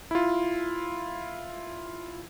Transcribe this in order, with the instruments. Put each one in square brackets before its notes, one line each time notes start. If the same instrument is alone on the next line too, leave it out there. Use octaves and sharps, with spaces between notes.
[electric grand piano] E4 F4